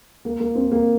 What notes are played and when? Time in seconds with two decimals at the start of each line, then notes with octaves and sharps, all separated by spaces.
0.25 A#3
0.40 A#3
0.55 C4
0.72 A#3